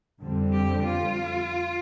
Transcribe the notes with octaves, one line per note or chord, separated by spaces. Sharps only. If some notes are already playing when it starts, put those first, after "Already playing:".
F2 D3 G3 C4
G4
F4